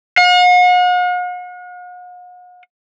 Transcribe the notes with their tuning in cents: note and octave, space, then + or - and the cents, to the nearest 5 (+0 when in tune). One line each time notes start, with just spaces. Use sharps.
F#5 -45